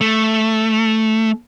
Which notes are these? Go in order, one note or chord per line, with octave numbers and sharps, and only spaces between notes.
A3